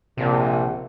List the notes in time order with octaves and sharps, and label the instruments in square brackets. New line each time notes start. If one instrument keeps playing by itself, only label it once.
[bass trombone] A#1 [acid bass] C3